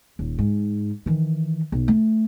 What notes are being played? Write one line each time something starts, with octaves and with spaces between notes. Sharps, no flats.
D#1
G#2
D#3 E3
B1
A3